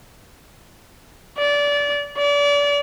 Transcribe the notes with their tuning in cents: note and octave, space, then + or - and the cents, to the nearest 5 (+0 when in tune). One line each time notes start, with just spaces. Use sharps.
D5 -25
D5 -35